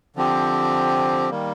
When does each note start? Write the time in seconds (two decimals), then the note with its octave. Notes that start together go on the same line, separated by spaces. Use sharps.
0.16 D3 F3 C4 G4
1.30 D#3 G3 A#3